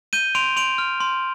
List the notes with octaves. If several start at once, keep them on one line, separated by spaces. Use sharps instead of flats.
G6 D#7 G7
C6 D7 F7
C6 D7 F7
F6
C6